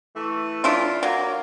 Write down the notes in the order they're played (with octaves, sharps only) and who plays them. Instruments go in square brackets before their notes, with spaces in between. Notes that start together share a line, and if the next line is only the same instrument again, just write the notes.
[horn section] E3 A3
[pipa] D4 E4 F4
[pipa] F#3 [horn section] A#3